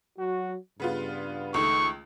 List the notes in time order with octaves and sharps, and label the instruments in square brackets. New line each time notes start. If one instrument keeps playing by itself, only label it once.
[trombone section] F#3 F#4
[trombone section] G2 [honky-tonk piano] C#3 B3 F4
[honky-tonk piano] C#2 D#3 A3 [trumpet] C#6